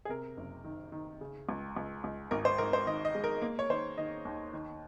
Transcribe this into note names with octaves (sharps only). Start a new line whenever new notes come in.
G#4
C3 A#4
F#1
D#3
D#3
C#3
C#2
C#2
C#2
G#1 A#4
C5
G#2 A#4
C5
D#3 D#5
D#5
G#3
A#4
A#3
C#5
D#3 C5
D#3 D#5
D#2
D#3